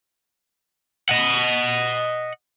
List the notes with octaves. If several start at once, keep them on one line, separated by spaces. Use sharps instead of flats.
D#5 F#5